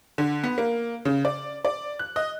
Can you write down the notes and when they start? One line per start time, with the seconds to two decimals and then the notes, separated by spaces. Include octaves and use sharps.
0.18 D3
0.44 B3
0.58 A#3
1.05 C#3
1.25 D5
1.65 D5
1.99 F#6
2.16 D#5